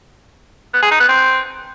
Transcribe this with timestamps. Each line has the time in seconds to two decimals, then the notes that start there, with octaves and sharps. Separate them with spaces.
0.74 B3
0.82 G#4
0.91 D#4
1.00 B3
1.09 C4